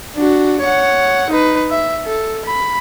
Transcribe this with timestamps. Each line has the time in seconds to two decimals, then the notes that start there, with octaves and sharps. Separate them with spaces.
0.16 D4 F#4
0.61 C#5 F#5
1.30 D#4 B4
1.71 E5
2.06 A4
2.46 B5